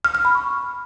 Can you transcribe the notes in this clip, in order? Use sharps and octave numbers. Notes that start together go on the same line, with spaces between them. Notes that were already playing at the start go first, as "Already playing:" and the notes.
F6
F6
B5
C#6